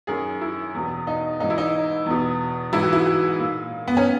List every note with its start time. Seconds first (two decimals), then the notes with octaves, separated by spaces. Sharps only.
0.07 F#2 D#3 G#4
0.41 E4
0.75 E2 B2
1.07 D#4
1.40 G#2 E3 D#4
1.50 E4
1.58 D#4
2.06 E2 B2
2.73 G#2 E3 E4
2.83 F#4
2.93 E4
3.06 F#4
3.38 A#2
3.88 B3
3.97 C#4